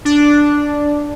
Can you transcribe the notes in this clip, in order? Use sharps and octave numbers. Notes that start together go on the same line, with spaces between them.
D4